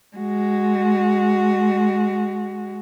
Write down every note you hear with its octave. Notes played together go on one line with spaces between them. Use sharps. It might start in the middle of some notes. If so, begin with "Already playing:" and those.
G#3 F#4